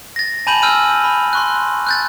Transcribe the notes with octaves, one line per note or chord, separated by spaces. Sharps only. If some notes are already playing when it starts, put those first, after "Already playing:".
A6 A#6
G#5 A5 B5 G6 D#7 F#7
G#5 E6 F6 G6 D#7
B5
C6 C#6 F#6
F#6 G6 A6